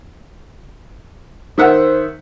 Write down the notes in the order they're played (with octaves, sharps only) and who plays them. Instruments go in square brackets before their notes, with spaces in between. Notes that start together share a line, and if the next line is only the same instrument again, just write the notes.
[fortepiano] D#3 E5 F#5 [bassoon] C5